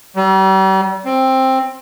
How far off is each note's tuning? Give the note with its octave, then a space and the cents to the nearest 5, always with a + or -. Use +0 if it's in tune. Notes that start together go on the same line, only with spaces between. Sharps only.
G3 -40
C4 +10